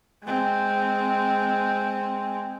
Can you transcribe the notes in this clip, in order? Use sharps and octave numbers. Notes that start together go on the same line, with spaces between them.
G#3 C4